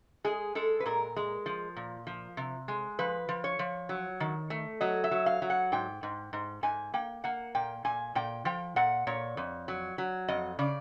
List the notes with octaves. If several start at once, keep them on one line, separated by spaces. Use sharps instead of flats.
G#3 G#4
G#3 A4
B4
A#2 A#4
G#3
F3
A#2
F3
C3
G#3
F3 B4
F3
C#5
F3
F#3
D#3
A3
F#3 D#5
E5
F#3
F5
F#3
F#5
G#2 G5
G#2
G#2
G#2 G#5
A#3 G5
A#3 F#5
A#2 G5
A#2 G#5
A#2 G5
F3 G5
A#2 F#5
A#2 C#5
F2
F#3
F#3
F2 D#5
C#3 D5